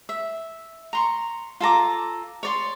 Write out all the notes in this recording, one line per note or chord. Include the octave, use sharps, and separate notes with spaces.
E5
A#5 C6 C#6
F4 A4 A#5 D6
C#5 D5 C6